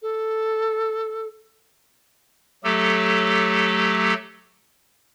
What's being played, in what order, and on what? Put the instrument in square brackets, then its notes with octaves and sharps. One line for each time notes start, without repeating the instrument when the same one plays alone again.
[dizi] A4
[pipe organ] F#3 A3 G4 A4